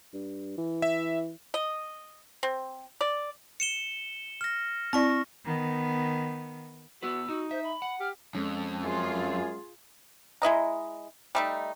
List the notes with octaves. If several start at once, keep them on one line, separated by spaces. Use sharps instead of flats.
G2
E3
E5
D#5
C4
D5
C#7 E7 G7
F6 A#6
C4 E4 D5 C#6 A#6
D#3 B3
B3 E4 F#4 B4 E6
D#4 F#4
C5 E5
B5
F#5
G4 F6
F2 G#3 C#4
F#2 F4 G#4
G#3 E4 D#5 A#5
G3 A3 D#4